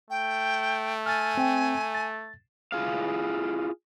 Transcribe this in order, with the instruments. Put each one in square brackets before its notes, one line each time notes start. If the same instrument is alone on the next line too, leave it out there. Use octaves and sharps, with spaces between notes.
[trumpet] A3 [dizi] G5
[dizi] G#5 [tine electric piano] F6 A6
[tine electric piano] C4 G5
A6
[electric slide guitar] E4 F4 G#4 F5